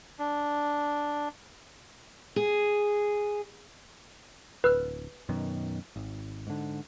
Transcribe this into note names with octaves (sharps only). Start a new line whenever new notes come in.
D4
G#4
D1 B4 E6 F6
F#2 B2 D#3
G#1
G#2 D3